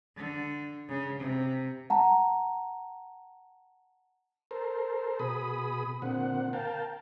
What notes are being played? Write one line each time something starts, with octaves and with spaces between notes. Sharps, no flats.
D3
C#3
C3
F#5 A5 A#5
A4 A#4 C5
B2 G#4 B5 D#6
A#2 D3 C4 F#5
A#4 F5 G5 A5